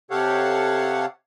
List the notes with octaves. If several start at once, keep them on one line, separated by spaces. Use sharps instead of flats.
C3 G4 A4 C#5 F5 F#5